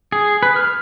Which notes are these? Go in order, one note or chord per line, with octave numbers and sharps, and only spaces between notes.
G#4
B4
F6